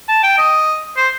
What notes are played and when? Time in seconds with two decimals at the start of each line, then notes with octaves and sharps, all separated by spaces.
0.09 A5
0.23 G5
0.38 D#5
0.97 C5